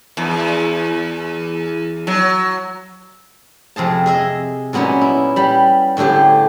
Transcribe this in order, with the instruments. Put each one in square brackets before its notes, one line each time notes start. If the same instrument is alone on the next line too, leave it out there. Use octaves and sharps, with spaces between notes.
[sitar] E2
F#3
[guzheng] F2 C3 G#4 A5
G#4 D#5 E5
A#2 F#3 B3 C#4 D#4
E4
G3 B5
A2 D3 A3 G4 G#4